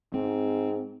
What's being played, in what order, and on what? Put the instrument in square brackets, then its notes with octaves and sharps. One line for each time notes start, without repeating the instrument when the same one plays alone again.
[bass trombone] G#2 [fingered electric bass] C4